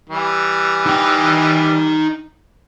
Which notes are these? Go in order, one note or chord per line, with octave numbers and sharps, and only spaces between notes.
E3 G3
D#4 G5